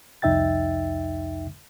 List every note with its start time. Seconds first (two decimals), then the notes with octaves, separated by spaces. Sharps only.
0.22 C2 F2 D#4 E5 G5 A6